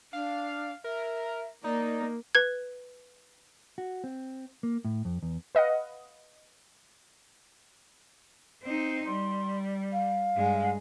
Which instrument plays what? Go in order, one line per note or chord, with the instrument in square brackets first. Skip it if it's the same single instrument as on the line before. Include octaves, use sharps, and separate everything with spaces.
[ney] D4 [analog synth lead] F5
[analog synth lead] A#4 [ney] E5
[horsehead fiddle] A#3 [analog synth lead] D#4 [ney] D5
[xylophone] B4 G#6
[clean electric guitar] F#4
C4
A#3
A2
F2
E2
[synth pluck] B4 D#5 F5 F#5
[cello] C4 D#4
[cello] G3 [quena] C6
[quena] F5
[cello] G2 G#3